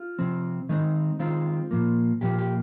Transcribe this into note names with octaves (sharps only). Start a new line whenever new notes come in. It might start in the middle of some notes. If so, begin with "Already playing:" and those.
Already playing: F4
C3 F3 C4
D#3 G#3 C4 D#4
D#3 G#3 C4 F4
A#2 F3 A#3
A#2 F3 A#3 G4
G4